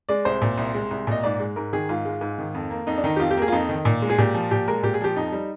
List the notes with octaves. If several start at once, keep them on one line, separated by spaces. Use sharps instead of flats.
G#3 D5
C2 C5
A#2
C2
G#3
C2
A#2 D#5
G#2 D5
G#3
G#2 A#4
D#3 G#4
G#2 F4
G#3
G#2
D#3
F2
A#3
F2 D#4
D4
D#3 D#4
G4
F2 F4
G4
A#3 G#4
F4
F2 D#4
D#3
A#2
G#3
G#4
A#2 G4
F3
A#2 G4
G#3 A#4
A#2 G4
G#4
F3 G4
F2 D#4
G3